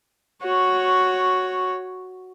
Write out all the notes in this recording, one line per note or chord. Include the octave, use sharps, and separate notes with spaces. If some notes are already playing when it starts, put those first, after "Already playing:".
F#4 C#5